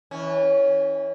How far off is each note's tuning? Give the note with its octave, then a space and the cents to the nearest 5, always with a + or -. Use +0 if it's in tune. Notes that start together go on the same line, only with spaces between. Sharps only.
E3 -25 C#4 +5